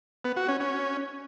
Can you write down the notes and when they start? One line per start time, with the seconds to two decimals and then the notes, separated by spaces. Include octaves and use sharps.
0.25 B3
0.36 F#4
0.48 C#4
0.60 C#4